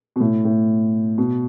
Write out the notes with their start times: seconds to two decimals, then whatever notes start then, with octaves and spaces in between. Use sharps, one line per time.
0.16 B2
0.20 A2
0.45 A2
1.18 B2